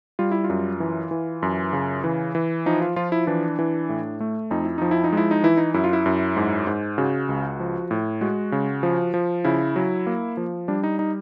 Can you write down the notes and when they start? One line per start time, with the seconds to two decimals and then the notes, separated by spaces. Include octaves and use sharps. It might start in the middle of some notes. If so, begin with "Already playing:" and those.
0.19 G3 F4
0.32 E4
0.44 F4
0.50 F#2
0.80 E3
1.11 E3
1.43 F#2
1.73 C#3
2.04 E3
2.35 E3
2.66 F3 D#4
2.82 F4
2.96 F3 F4
3.12 E4
3.27 E3 D4
3.59 E3
3.89 A2
4.20 A3
4.51 F2 D#4
4.65 E4
4.78 F3 D#4
4.91 E4
5.04 D#4
5.13 G#3 E4
5.31 D#4
5.44 E3 E4
5.57 D#4
5.74 F#2 E4
5.84 F4
5.93 E4
6.06 F#2
6.37 G#2
6.67 G#2
6.98 C#3 F#4
7.29 C#2
7.60 F3
7.91 A2
8.21 G#3 F#4
8.52 C#3
8.83 F3
9.14 F3
9.44 C#3 E4
9.76 F#3
10.06 A#3
10.37 F3
10.68 G3 D4
10.83 D#4
10.99 D#4